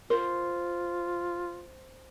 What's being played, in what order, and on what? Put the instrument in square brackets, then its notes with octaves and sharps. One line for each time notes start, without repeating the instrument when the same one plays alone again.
[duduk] F4 [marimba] A#4 [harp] C5